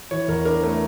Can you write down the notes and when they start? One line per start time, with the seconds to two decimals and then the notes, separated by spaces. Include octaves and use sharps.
0.11 E3 C#5
0.28 E2 A#4
0.45 D4 A#4
0.63 A3 A#4